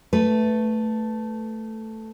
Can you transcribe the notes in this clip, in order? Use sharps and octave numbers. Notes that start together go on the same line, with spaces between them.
A3 B4